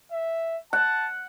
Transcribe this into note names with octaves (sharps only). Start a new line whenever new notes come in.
E5
F#5 A5